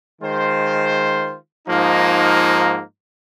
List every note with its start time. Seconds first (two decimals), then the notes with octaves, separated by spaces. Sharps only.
0.21 D#3 G#3 F4 C5
1.67 G#2 F3 A#3 D#4